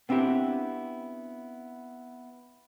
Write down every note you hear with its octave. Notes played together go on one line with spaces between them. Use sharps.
B3 C4 D4 E4 G4